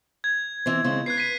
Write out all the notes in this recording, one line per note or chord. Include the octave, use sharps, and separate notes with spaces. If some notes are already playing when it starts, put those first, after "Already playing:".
G#6
E3 C4
C#3 G#3 C4
B4 F#6 G#6 C7
B6 D#7